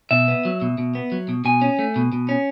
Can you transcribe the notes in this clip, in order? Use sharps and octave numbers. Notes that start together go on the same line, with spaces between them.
B2 E5
B3
F#3
B2
B2
B3
F#3
B2
B2 G#5
C#4
A3
B2
B2
C#4